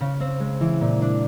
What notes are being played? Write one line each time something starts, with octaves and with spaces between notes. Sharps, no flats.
C#3
C4
G#3
E3
A#2
D4